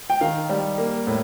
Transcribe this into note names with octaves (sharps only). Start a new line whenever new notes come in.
G5
D#3 F5
G3
A#3
A2